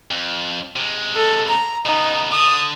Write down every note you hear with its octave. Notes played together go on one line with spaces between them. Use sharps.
F2
C3 G#3
A4
A#5
C#3 B3 D#4
D3 D#6